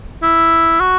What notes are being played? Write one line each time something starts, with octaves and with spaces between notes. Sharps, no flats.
E4
F#4